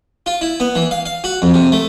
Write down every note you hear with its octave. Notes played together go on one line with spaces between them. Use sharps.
F4
E4
B3
E3
F5
F5
F#4
F2
C3
A3